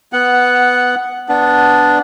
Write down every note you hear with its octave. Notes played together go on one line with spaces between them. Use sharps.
B3 F#5
B3 D4